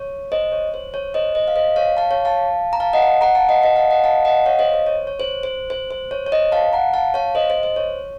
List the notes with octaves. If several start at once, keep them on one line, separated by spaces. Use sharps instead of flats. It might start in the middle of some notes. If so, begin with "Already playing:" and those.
Already playing: C#5
C5 D#5
C#5
C5
C#5
C5 D#5
C5 D#5
F5
C5 D#5
C#5 F5
F5 A5
C#5 F5
F5 A5
A#5
F5 A5
D#5 F#5
F#5 A#5
F5 A5
D#5 F#5
D#5 F#5
F5 A5
D#5 F#5
F5 A5
D#5 F#5
C#5 F5
C5 D#5
C5
C#5
C#5
C5
C5
C5
C5
C#5
C#5
C5 D#5
F5 A5
F#5 A#5
F5 A5
C#5 F5
C5 D#5
C5 D#5
C5
C#5